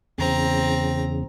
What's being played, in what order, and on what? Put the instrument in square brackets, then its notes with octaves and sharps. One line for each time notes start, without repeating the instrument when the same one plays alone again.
[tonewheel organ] E2 C#3 [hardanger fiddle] C4 A#5